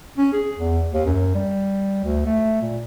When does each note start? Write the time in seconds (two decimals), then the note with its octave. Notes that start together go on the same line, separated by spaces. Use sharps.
0.18 C#4
0.33 G#4
0.57 E2
0.93 D#2
1.06 F#2
1.35 G3
2.04 D2
2.26 A3
2.62 A#2